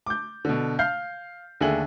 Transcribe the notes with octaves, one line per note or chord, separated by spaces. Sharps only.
D6 G6
B2 D3
F5 F6 G6 C7
D#2 D3 A3 G#4 F#7